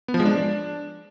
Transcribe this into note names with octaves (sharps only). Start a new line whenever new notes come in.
B3
F3
G#3
D4